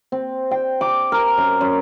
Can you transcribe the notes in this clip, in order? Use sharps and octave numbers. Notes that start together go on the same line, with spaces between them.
C4
G5
D6
A#4
F#2
F#2